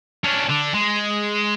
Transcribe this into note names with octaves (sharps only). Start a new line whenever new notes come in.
C#4 D4
D3 D4
G#3